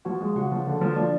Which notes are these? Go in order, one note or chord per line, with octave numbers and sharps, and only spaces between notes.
F3 F#4 F#5
G#3
C#3 F#4 F#5
F3
D3
F3
F3 D4 D5